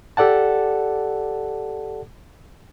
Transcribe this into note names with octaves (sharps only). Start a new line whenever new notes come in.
G4 A4 D5 F#5 A5